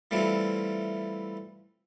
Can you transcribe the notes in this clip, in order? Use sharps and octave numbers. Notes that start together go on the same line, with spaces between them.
E3 G3 A3 C4 E4 F4